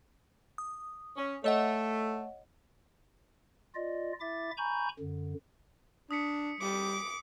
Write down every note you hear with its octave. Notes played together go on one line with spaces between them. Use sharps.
D#6
C#4
A3 C#5 D#5 F#5
F4 D5 D#5
E4 E5 D6 A6
G#5 A#5 B5 C#6 G6
F#2 D3
D4 D#6 B6 C#7
G3 D6